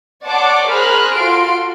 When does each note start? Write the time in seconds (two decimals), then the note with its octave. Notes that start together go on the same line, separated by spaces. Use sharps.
0.24 C#5 D5 F#5 A5 C6 D6
0.68 G#4 A#4 C5 B5 F6 F#6
1.14 F4 F#4 A4 C6 D7